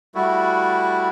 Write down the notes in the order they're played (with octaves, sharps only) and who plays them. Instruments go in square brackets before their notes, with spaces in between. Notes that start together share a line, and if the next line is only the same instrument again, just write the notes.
[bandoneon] G3 A3 E4 F#4